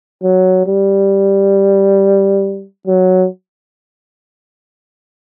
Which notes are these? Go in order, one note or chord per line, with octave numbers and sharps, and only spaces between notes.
F#3
G3
F#3